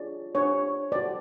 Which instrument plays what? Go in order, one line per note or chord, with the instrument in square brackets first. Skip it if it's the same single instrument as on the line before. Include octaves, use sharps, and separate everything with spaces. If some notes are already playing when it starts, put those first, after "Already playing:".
Already playing: [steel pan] D4 F4 G#4 C#5 D5
D4 G4 C5 C#5
F#4 A4 C5 D5